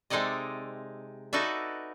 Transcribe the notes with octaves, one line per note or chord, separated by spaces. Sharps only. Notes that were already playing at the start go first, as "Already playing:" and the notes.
C3 G#3 D#4 A4 D5 D#5
D#4 F#4 A4 B4 D5 E5